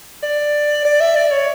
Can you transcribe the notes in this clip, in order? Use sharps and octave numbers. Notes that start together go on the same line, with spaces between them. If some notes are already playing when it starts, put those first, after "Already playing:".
D5
D5
E5
D5
C#5